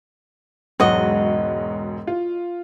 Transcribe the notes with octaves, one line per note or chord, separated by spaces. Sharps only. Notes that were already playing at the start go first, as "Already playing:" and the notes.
E1 G#2 F#3 F#4 D#5
F4